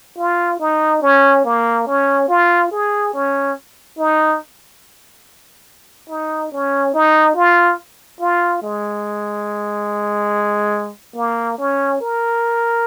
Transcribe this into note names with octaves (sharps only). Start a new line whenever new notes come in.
F4
D#4
C#4
A#3
C#4
F4
G#4
C#4
D#4
D#4
C#4
D#4
F4
F4
G#3
A#3
C#4
A#4